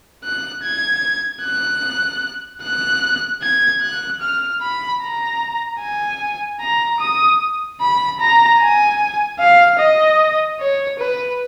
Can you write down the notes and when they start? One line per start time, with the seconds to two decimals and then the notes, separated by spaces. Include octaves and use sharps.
0.24 F#6
0.63 G#6
1.43 F#6
2.63 F#6
3.43 G#6
3.83 F#6
4.22 F6
4.62 B5
5.02 A#5
5.81 G#5
6.61 A#5
7.00 D#6
7.81 B5
8.20 A#5
8.61 G#5
9.40 F5
9.79 D#5
10.60 C#5
10.99 B4